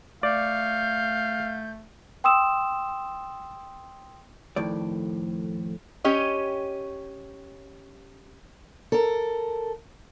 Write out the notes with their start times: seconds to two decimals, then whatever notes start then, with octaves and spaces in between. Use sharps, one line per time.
0.23 A3 D5 F5 G6
2.24 G5 C6 D#6 E6 E7
4.56 F2 A2 D#3 D5
6.04 C#4 G4 C#5 D#5
8.92 A4 A#4